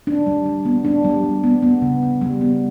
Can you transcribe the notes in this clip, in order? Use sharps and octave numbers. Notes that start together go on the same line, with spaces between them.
D4
G3
G3
B3
D4
G3
G3
B3
B3
C#3
C#3
G3
B3